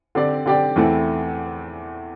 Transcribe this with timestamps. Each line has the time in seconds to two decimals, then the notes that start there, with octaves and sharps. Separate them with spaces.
0.15 D3 C4 G4 D5
0.46 D3 C4 G4 D5
0.76 E2 E3 A3 C4 E4